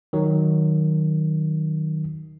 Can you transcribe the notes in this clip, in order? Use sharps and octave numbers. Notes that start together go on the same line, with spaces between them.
D#3 F#3